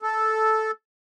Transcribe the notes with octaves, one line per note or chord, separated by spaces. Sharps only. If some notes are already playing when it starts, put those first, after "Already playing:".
A4